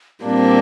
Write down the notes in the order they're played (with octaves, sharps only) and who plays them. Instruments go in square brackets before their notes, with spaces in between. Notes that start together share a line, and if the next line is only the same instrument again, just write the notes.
[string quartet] A#2 G3 A#3 D4 [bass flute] C4